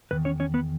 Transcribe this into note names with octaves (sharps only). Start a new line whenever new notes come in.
E2 D#3 B4
C#4 C#5
C#4 C#5
B3 B4